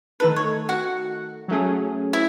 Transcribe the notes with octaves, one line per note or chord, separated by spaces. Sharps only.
D#3 A3 D#4 A4 B4
C#5
F#4 F#5
F#3 A3 C#4 G#4
E4 E5